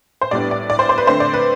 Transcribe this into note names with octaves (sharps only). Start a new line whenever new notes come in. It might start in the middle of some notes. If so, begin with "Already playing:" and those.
C5
A2 G3 B3 D4 D5
D5
D5
C5
C5
B4
D3 A3 C4 C5
D5
B4